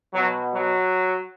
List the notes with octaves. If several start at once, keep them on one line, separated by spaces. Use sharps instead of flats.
B2 F#3
F#3